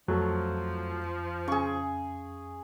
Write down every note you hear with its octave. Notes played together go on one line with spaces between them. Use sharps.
F2 F3 F#3 A3
C#3 G#4 C#6